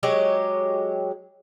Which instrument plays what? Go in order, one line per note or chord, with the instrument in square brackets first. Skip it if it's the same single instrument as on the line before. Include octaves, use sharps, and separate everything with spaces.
[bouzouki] F#3 G#3 G4 C#5